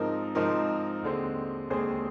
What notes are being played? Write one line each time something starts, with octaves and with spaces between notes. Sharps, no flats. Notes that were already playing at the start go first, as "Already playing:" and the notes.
Already playing: G#2 F3 C4 D#4 A#4
G#2 F3 C4 D#4 A#4
D#2 D3 G#3 C4
D#2 D3 G#3 C4 G#4 C5